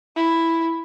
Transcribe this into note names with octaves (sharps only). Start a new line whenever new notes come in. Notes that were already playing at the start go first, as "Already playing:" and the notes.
E4